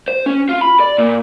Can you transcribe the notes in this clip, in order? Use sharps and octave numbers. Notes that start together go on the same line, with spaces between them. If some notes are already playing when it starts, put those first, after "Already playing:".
C5
C#4
F4
B5
D5
A#2